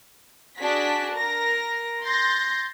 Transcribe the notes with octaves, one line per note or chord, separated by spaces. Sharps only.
D4 F#4 G#4 B6
A#4 A#6
C6 G6 A6 A#6